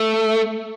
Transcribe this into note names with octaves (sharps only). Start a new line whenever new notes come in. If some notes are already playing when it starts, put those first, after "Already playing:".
Already playing: A3